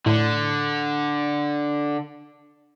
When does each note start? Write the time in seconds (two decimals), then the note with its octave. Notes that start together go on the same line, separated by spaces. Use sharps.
0.06 A2 D3